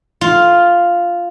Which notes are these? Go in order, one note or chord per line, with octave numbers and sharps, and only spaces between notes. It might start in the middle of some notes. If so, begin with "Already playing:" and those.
F4